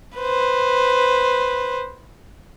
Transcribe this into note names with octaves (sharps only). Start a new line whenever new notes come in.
B4 C5